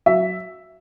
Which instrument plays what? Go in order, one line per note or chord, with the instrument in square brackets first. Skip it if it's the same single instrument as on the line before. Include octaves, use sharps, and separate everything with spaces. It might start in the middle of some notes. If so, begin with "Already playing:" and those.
[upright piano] F#3 E5